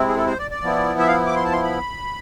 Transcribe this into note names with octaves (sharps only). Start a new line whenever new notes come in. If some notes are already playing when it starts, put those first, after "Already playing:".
Already playing: C3 G#3 C4 E4
G#4
A4
C5
D5
D5
F3 B3 E4
E5
F5
D6
C6
A5
C6
B5